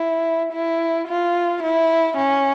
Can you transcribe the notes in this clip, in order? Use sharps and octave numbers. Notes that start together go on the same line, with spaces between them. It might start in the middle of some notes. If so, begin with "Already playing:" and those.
Already playing: E4
E4
F4
E4
C#4